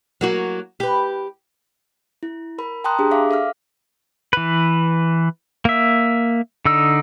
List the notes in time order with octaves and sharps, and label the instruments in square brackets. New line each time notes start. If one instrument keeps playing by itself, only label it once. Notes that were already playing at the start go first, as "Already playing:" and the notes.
[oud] F#3 A#3 F#4
G4 B4
[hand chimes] E4
A#4 B5
G5 A5 A#5 C6 D#6 F#6
D4 G4 G#4
E5 F5 D6
A4 E5 F5 F6
[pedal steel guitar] E3 B4
A#3 E5
D3 D#4 E6